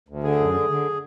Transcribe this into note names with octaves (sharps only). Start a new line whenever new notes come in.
D2
D3 G#4
F#2
D3
D3